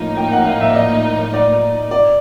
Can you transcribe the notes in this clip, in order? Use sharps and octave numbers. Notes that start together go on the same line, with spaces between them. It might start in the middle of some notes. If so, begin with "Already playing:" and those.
Already playing: A2 F3 A#3 D#4
G5
F#5
F5
E5
D5
D#5
D5
D5